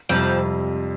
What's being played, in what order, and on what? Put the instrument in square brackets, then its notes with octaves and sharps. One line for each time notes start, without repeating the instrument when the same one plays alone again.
[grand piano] F2 C3 G3 [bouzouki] F3